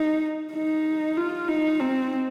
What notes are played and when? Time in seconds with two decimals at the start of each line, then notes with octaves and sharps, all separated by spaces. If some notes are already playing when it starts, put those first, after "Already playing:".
Already playing: D#4
0.54 D#4
1.17 F4
1.48 D#4
1.80 C4